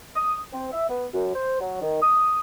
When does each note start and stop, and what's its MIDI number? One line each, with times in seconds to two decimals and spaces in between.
0.16 0.38 87
0.53 0.68 60
0.72 0.86 76
0.89 1.05 59
1.14 1.29 42
1.34 1.60 72
1.60 1.80 54
1.81 2.00 51
2.01 2.40 87